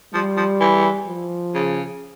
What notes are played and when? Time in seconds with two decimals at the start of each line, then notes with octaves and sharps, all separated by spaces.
0.14 F3 G3
0.37 F3
0.61 E3
1.07 F3
1.55 C#3